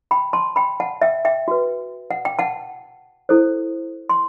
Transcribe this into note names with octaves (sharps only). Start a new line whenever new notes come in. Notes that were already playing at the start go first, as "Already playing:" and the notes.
G5 B5
A5 C6
G5 B5
F#5 A5
E5 G5
E5 G5
F#4 B4
F#5
G5
F#5 A5
E4 A4 C5
C6